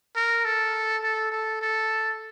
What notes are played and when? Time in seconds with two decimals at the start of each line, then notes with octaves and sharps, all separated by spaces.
0.16 A#4
0.45 A4
1.03 A4
1.32 A4
1.62 A4